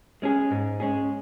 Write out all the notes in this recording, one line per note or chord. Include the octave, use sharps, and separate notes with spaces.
G#3 C#4 G#4
G#2
G#3 C#4 G#4